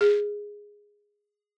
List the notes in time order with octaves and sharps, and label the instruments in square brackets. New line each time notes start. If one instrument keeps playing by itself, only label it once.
[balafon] G#4